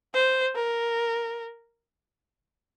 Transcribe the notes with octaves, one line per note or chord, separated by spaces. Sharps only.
C5
A#4